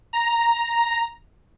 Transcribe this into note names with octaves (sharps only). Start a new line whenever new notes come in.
A#5